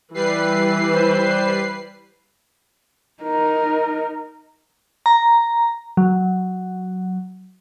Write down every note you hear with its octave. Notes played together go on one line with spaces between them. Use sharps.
E3 G3 B4 C7
C5
D#4 A#4
A#5
F#3